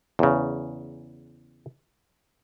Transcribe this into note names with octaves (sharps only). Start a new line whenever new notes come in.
E2 C#3